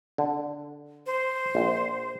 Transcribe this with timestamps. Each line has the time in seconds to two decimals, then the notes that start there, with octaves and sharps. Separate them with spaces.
0.18 D3
1.06 C5
1.55 A#1